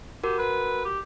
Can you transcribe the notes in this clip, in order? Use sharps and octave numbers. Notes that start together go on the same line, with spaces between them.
F#4 G4 A#4
B4
G4